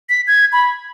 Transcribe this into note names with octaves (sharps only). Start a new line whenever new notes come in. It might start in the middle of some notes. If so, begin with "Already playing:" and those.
B6
G#6
B5